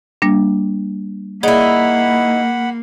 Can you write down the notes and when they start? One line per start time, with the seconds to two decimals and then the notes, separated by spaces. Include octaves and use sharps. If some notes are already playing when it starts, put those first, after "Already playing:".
0.22 G3 A#3 D4
1.43 A#3 D#4 E4 G#4 D5 F#5 B5